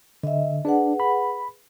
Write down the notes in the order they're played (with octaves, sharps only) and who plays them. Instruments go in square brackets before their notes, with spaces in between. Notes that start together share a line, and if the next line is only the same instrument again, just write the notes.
[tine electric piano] D3 [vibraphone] D#5 E5
[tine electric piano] D4 [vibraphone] G#4 B4 F#5
[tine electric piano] B5